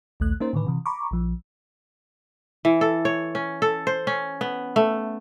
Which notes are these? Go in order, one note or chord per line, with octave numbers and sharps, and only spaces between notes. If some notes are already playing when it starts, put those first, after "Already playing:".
A#1 D#2 A3 F#6
A#3 C#4 D#4 A#4 C5
A2 D3 D#3 B4
C3 E3
A#5 B5 C#6 D6
A#1 F3
E3
A4
C#5
C#4
A4
C5
C#4
B3
A3